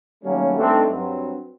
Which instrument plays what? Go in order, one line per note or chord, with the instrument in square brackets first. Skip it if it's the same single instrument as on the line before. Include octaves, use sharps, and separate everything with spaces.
[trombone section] D#2 F#3 G3 A3 A#3 C#4
G2 A3 C4 D4 D#4 A4
G2 F#3 C4